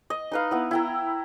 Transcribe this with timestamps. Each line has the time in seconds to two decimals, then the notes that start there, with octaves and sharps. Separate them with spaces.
0.10 D#5
0.32 D#4 B4 F5
0.51 B3 E4
0.71 E4 G5 A#5